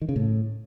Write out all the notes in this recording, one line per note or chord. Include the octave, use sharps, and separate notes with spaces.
D#3
C#3
A2